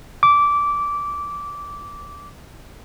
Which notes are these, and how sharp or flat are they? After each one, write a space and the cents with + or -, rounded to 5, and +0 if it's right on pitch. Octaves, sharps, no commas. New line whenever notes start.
D6 -15